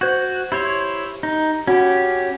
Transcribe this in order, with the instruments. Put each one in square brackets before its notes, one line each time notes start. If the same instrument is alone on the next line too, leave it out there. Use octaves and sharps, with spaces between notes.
[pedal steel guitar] F#4 [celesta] C5 G6 G#6
[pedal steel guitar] E4 C5 C#5 [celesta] G4
[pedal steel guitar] D#4
[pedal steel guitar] C#4 G4 [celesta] F#4 F#5 B5